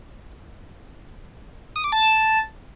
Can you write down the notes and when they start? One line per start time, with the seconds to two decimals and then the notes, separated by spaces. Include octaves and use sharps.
1.76 D#6
1.84 D6
1.92 A5